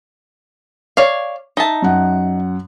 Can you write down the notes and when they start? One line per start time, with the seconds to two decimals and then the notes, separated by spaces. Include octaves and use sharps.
0.97 C#5 D5 F5
1.57 D#4 E5 A5
1.82 F#2 F#5